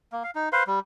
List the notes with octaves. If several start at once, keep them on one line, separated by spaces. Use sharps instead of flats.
A#3
F5
D#4
B4 C5 F5 C6
G3